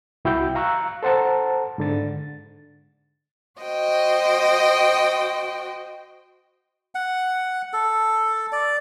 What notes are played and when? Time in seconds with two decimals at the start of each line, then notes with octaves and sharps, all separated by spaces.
0.25 C2 E4 F#4 G5 E6 G6
0.55 F5 A#5 C#6 E6 F#6
1.03 A4 C5 F#5 A5 A#5
1.78 G#2 D3 A6
3.60 F#4 C5 D#5 G5
6.95 F#5
7.73 A4
8.52 D5